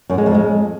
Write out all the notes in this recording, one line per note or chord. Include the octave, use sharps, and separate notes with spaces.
F#2
G#3
F2
G#3